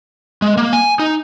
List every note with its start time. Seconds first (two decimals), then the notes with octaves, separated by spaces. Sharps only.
0.42 G#3
0.57 A#3
0.73 G#5
0.99 D#4